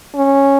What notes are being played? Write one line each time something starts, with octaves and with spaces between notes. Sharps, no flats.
C#4